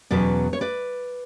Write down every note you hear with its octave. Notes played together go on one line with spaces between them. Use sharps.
E2 B2 F#3 C#4 B4 D5
C#5
B4 D5